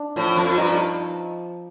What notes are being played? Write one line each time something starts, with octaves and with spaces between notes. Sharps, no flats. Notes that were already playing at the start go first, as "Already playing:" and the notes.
Already playing: D4
A2 F3
F2
G2 D#4